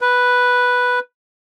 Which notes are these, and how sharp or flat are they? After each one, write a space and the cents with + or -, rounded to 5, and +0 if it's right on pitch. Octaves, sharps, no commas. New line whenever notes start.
B4 +0